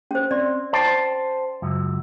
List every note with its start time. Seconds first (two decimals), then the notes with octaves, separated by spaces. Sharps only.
0.11 C#4 C5
0.31 C4 D5
0.73 C5 G5 A5
1.62 C#2 F#2